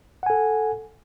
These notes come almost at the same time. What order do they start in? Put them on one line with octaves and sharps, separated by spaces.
F#5 G#5 A4